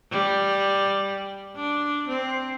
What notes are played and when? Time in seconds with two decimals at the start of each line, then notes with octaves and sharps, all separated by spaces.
0.11 G3
1.55 D4
2.08 C4